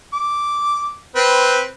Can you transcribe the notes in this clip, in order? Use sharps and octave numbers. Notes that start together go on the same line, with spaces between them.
D6
C4 B4